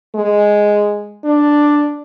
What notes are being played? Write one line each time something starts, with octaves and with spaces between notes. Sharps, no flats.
G#3
D4